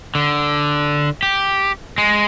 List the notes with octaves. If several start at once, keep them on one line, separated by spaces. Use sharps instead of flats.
D3
G4
G#3